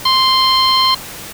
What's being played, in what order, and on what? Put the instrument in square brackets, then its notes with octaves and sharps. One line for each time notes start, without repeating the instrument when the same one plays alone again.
[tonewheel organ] C6